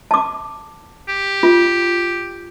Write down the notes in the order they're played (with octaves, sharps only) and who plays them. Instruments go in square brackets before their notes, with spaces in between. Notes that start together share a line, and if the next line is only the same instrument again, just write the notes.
[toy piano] A5 D6
[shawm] G4
[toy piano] F4